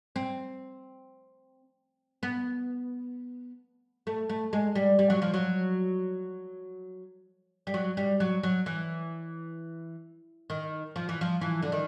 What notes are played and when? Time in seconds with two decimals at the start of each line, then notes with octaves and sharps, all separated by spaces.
0.16 C4
2.23 B3
4.07 A3
4.30 A3
4.53 G#3
4.75 G3
4.99 G3
5.10 F#3
5.22 F3
5.34 F#3
7.67 G3
7.74 F#3
7.97 G3
8.20 F#3
8.43 F#3
8.66 E3
10.50 D#3
10.96 F3
11.09 E3
11.21 F3
11.41 E3
11.62 D3
11.72 D#3